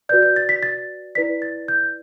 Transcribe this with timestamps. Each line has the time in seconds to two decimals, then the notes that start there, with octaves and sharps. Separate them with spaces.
0.09 F#4 B4 D5 G6
0.22 G6
0.36 A6
0.49 B6
0.63 A6
1.15 E4 B4 D5 B6
1.42 A6
1.68 G6